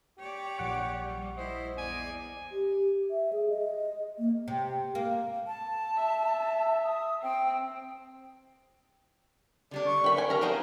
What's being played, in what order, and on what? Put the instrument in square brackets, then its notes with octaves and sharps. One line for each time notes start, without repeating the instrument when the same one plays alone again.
[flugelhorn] G4 [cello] C#5 D5
[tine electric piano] A#1 F#5 C#6
[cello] G3
[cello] E4 [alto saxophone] C5 [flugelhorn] D#5
[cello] E2 D5 [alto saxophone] G#5
[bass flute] G4
E5
G#4
D#5
A#3
[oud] C3
A#3
[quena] A5
[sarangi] E5
[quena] D#6
[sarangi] C4 [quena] G5
[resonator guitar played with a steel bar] D3 G3 D4 [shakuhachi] D5
[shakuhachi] C#6
[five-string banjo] D#3 B5
C4 G#5
[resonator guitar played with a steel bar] G4 [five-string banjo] A#4 A#5 [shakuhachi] F5
[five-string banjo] F3 B3 [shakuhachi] D#4 [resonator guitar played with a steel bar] A#4 C5 G5